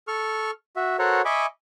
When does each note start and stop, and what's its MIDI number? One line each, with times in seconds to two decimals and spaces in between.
0.08 0.51 69
0.08 0.51 85
0.08 0.51 89
0.76 0.97 66
0.76 0.97 76
0.99 1.22 66
0.99 1.22 69
0.99 1.22 70
0.99 1.22 72
0.99 1.22 73
0.99 1.22 78
1.25 1.46 75
1.25 1.46 76
1.25 1.46 80
1.25 1.46 83
1.25 1.46 85
1.25 1.46 86